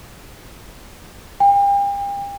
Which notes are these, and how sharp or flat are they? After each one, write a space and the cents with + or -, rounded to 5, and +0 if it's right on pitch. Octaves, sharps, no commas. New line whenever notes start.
G5 +40